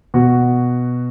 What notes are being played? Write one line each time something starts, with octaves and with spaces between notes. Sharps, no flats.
B2 F#4